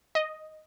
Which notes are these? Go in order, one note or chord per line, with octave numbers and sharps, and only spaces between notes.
D#5